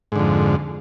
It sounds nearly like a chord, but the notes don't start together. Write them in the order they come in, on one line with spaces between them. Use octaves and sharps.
G#2 D3 F2